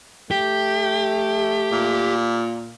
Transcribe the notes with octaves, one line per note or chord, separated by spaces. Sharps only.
A3 G4
A#2